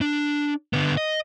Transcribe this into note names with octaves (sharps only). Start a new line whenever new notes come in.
D4
D3 B3
D#5